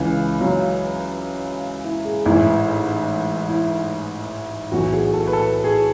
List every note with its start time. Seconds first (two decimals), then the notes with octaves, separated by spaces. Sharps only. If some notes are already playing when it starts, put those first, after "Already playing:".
Already playing: C#2 C#3 E3
0.41 F#3
1.84 E4
2.05 G#4
2.25 A1 G#2 E3 E4
3.49 E4
4.72 B1 A2 E3 F#4
4.93 G#4
5.13 A4
5.27 B4
5.33 A4
5.64 G#4